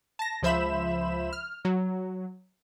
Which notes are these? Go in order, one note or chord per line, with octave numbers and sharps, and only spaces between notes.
A5 A#6
C#2 F3 C5 E5 B5 E7
F6
F#3